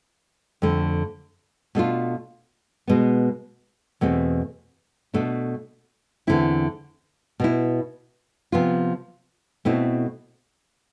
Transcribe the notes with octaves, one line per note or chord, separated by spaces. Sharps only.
F2 D3 A3
B2 A3 D4 F4
B2 G#3 B3
E2 B2 A3 C4
B2 A3 D4
E2 D3 A3 C4 E4
B2 B3 E4
C3 F3 B3 F4
B2 A3 C4 E4